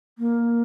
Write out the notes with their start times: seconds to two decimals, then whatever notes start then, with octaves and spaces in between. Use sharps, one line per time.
0.18 A#3